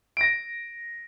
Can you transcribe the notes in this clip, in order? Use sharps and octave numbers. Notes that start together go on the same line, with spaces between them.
A#6 D7